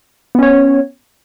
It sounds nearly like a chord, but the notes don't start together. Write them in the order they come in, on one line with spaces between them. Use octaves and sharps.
B3 C#4 C#5